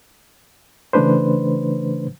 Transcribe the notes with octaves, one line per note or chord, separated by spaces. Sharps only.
C#3 E3 A3 D4 B4 C5